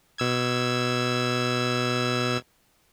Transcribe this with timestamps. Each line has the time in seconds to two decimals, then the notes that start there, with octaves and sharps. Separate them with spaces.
0.18 B2 E6 G#6